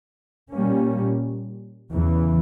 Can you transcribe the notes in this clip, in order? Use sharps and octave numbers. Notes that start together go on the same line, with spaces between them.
A#2 G3 A#3 C#4
E2 C#3 E3